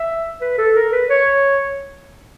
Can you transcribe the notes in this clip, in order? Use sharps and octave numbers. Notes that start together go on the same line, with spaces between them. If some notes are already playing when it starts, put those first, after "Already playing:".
Already playing: E5
B4
A4
A#4
B4
C#5